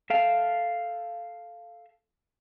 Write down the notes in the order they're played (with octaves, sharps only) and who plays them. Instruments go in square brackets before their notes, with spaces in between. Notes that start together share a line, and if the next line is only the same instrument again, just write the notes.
[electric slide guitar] A4 E5 F5 G5 A5